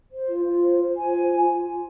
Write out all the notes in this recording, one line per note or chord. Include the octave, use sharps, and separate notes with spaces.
C5
F4
F4
C5
C5
F4 G#5
C5
F4
F4
F4